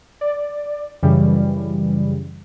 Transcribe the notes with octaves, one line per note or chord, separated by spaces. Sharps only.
D5
F#2 C#3 E3 G3